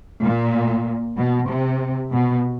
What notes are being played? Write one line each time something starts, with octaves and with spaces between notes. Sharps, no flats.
A#2
B2
C3
B2